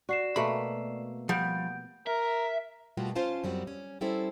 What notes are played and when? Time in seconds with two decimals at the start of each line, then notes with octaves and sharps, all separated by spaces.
0.09 F#4 D5 C7 E7
0.36 B2 A3 A#3 B5
1.29 F3 G3 F#5 G6 D7
2.07 A#4 E5
2.97 B2 G3 A3 A#3 F4 F#4
3.15 C#4 F4 C5 F5 A5
3.44 F#2 G3 C4 F#4
3.67 C#4
4.01 G3 C#4 E4 A4 C5